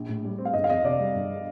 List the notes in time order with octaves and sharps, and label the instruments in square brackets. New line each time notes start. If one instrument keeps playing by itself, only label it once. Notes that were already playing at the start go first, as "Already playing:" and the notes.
Already playing: [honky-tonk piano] A#1
A2
G3
C4
[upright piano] F5
[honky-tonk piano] G1 [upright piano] D#5
[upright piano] F5
[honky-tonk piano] F2 [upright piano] D#5
[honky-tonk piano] C3 [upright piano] D5
[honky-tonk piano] G3
G1